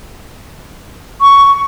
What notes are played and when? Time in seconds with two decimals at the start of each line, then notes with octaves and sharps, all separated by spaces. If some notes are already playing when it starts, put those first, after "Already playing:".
1.20 C#6